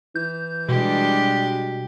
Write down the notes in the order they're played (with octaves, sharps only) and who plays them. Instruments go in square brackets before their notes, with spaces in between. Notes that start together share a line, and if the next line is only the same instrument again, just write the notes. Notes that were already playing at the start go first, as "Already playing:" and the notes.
[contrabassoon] E3 [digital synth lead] G6
[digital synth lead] B2 [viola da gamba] G3 G#3 D4 [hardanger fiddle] G4